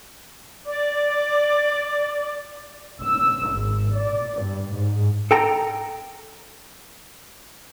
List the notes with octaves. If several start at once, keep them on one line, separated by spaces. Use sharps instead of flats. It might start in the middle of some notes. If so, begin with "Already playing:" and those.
D5 D6
E6
G#1
D5
G2
G#2
A4 G5 A#5